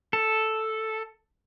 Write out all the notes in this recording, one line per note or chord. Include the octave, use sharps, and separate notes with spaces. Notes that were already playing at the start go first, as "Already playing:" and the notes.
A4